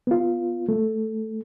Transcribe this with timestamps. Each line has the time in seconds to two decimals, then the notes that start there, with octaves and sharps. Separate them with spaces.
0.07 B3 F4
0.69 A3